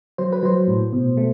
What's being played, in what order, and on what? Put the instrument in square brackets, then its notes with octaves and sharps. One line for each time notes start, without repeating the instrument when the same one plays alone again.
[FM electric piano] F#3 C5
B4
F#3 C5
A2
B2
A3